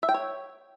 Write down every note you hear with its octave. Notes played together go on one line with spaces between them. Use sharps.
E5
G5
C#5